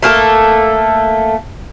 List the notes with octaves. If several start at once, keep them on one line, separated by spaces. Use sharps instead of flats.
A3 A#3 G#4 A4